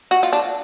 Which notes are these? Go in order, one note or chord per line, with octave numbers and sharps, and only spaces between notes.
F#4
F4
D4